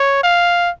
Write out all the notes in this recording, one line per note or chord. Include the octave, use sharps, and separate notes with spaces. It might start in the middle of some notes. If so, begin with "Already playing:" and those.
Already playing: C#5
F5